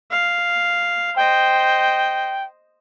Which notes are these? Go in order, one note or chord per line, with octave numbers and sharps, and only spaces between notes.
F5
C5 D#5 G5